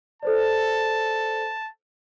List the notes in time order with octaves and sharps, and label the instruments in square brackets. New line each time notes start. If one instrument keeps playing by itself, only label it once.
[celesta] A4 C5 D5 [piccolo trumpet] A5